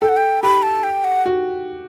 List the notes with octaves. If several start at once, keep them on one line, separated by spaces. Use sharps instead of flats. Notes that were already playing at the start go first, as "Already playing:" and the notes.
A4 G5
F#5
G5
G4 B5
A5
G5
F#5
F#4